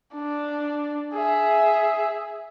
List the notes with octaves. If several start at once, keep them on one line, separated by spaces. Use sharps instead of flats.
D4
G#4 E5